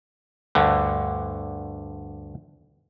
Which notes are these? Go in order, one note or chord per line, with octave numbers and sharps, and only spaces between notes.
D2 G2 D3